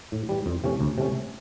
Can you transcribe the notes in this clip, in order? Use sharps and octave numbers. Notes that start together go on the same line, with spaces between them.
A2
E3 G3
F2
C3 E3 A3 C#4
D2
C3 E3 A3 C#4